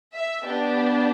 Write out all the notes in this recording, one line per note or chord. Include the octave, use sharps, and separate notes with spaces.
E5
B3 D4 G4